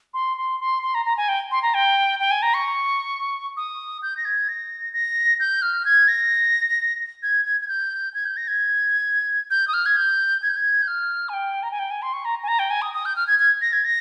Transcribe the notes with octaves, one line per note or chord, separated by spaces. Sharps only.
C6
C6
C6
C6
A#5
A#5
G#5
G5
C6
A#5
G5
G5
G#5
A#5
C#6
D#6
G6
A#6
G#6
A#6
A#6
G6
F6
G#6
A#6
G#6
G#6
G#6
G6
G#6
G6
A#6
G#6
G6
D#6
F6
G#6
G6
G#6
G6
G#6
G6
F6
G#5
G5
A#5
G#5
G5
G#5
C6
C#6
A#5
G#5
A#5
G5
G#5
D#6
D#6
G6
F6
G#6
G#6
A#6
G#6
A#6